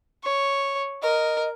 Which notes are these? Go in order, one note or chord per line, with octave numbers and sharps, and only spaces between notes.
C#5
A#4 D#5